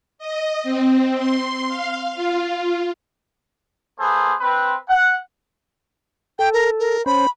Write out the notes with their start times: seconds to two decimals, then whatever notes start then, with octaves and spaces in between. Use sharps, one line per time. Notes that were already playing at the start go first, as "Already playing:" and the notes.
0.18 D#5
0.63 C4
1.16 C6
1.68 F5
2.15 F4
3.99 A#3 G#4 A4 B4 C5
4.41 C4 B4
4.89 F#5
6.39 A4 G5
6.53 A#4
6.80 A#4
7.06 C#4 C5 B5